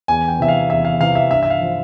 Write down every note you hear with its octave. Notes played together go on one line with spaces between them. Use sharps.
E2 G#5
G5
C3 E3 E5
F5
E2 E5
F5
C3 E3 F5
E5
G2 E5
E5
F5
F3